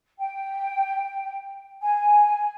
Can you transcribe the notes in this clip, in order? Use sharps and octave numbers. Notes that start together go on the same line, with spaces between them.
G5
G#5